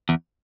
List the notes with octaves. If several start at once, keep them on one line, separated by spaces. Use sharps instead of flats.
E2